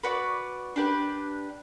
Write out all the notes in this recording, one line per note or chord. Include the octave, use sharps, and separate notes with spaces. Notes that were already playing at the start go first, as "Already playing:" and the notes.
F#4 B4 D5
D4 G4 B4